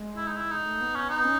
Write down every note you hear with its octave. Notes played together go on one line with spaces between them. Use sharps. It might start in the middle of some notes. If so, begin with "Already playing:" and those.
Already playing: G#3
E4
D#4
E4
D#4
A3
B3
C#4
D#4
C#4